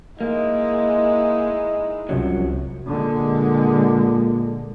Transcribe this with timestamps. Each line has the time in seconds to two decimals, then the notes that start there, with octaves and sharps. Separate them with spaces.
0.21 G#3 A#3 D#4 E4
2.09 C2 F#2 F3 F#3
2.87 A#2 D3 G#3